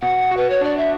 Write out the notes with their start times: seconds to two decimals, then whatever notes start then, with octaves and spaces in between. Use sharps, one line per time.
0.01 B2 F#5
0.31 F#4
0.37 B4
0.50 C#5
0.61 D4 D5
0.77 E5